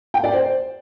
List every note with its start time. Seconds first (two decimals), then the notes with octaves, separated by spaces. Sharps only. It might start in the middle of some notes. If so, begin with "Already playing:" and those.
0.14 G5
0.24 D5
0.33 C5